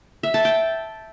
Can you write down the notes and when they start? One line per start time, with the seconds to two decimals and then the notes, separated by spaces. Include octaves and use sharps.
0.23 E5
0.34 A5
0.45 G5